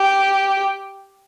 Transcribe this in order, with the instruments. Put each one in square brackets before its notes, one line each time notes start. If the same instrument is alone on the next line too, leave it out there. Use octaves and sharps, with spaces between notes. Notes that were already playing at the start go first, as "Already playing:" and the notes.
Already playing: [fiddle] G4